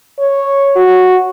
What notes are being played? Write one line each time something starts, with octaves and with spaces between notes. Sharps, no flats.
C#5
F#4